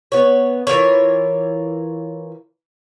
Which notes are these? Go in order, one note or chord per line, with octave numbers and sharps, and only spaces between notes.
B3 C#5
E3 F4 A#4 C#5